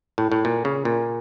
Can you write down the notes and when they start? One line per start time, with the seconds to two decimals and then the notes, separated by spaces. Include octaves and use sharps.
0.18 A2
0.32 A2
0.45 A#2
0.65 C#3
0.85 A#2